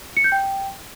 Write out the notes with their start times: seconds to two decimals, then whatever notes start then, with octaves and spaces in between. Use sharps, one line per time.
0.17 C#7
0.24 G6
0.32 G5